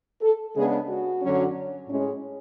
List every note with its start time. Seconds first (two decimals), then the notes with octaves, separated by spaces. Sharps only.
0.22 A4
0.55 C#3 G#3 B3 D4 G#4
0.88 F#4
1.21 F#2 D3 F#3 C#4
1.88 A2 G#3 C#4